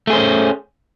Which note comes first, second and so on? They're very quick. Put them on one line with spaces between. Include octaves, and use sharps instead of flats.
A3 G#4 C5 C#4